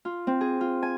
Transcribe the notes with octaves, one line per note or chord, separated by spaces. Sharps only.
F4
C4
G#4
F4
G#5